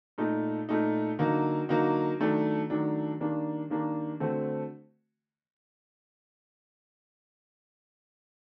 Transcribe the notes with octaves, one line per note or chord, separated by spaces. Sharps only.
A#2 A3 D#4
A#2 A3 D#4
D3 F#3 A#3 D#4 F#4
D3 F#3 A#3 D#4 F#4
D#3 F#3 A3 D4
D#3 F#3 A3 D4
D#3 G3 A#3 D4
D#3 G3 A#3 D4
D3 A3 C4 F#4